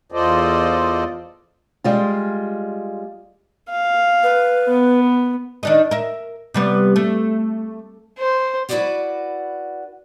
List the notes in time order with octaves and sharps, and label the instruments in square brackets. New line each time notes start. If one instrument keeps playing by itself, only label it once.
[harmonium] E2 F4 A4 C5 D5 D#5
[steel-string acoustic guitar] G3 G#3 F4
[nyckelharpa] F5
[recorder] B4
[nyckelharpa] B3
[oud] D#3 D4 D#4
A#4 E5
C3 G3 B3
A3
[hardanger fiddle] C5
[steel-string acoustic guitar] E4 F#4 A4 B4 D5 F#5